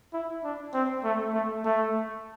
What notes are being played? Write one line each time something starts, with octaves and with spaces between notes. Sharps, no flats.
E4
D4
C4
A3
A3
A3